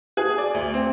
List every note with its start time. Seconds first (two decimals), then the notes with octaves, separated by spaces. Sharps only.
0.17 G#4
0.38 D5
0.54 D2
0.74 C4